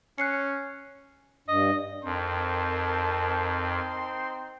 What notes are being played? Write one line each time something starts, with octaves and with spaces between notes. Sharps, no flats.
C#4 F#6 C7 C#7
G2 D#5
F2 C4 D#4 A#4 A5 C6